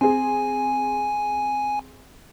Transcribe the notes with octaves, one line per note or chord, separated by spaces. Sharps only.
C4 G#4 G#5